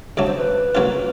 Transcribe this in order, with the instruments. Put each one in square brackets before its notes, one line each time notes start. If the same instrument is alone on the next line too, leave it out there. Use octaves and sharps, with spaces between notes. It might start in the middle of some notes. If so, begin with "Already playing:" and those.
[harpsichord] D2 C#3 F#3 A3 [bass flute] C#5
[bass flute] C5
B4
[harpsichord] C#3 F#3 A#3 C#4 F4